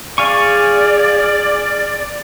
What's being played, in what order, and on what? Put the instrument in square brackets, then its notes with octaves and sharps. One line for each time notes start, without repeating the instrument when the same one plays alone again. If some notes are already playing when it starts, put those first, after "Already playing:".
[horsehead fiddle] G#4 [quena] D5 [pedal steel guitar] F5 G#5 C#6